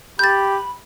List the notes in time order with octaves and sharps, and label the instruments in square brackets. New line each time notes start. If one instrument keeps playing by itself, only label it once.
[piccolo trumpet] G4 [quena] B5 [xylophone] G6 A6